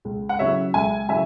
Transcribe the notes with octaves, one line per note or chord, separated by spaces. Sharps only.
C#2
F#5
C#3 F#3 C#4 E4 C#5 E5
C#2 E5 G#5
C#3 F#3 E4 E5 G#5